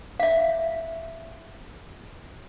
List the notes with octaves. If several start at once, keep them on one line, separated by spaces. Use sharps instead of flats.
E5 F5